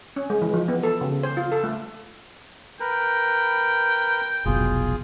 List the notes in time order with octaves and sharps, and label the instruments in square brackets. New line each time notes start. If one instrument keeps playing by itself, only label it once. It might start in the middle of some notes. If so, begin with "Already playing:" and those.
[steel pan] C#4
G#3
E3
F3
B3
A4
C#3
C5
F4
A4
A3
[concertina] A#4 B4 [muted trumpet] G5
[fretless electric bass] F1 B1 B2 [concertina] F4 G#4